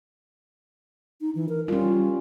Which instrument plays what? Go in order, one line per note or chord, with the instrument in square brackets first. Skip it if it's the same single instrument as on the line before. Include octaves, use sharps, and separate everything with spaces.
[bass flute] D#4
E3
A#4
[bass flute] G3 [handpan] C#4 F4